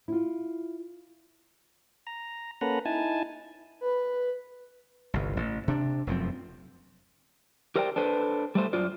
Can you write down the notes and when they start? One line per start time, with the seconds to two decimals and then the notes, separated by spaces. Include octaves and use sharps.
0.08 E4 F4
2.07 A#5
2.61 A#3 C#4 A4 B4 F#5 A#5
2.86 D#4 E4 G#5 A5
3.81 B4
5.14 G1 C2
5.37 A1
5.68 C3 D4
6.07 F1 F#2 F3 C4
7.76 G4 A#4 C5 D5 F5 G5
7.96 D4 A4 B4 C5
8.55 G3 A3 C5
8.73 F#2 F4 C5 D5